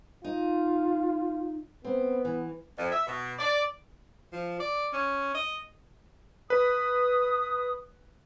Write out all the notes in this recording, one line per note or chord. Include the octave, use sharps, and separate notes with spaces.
D#4 F4
B3 C4
E3
F2
E5
B2
D5
F3
D5
C#4
D#5
B4 D#6